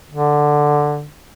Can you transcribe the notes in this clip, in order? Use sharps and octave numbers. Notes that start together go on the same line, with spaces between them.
D3